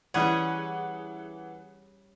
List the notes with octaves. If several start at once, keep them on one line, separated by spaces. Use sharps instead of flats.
E3 G3 C#4 G#4 F#5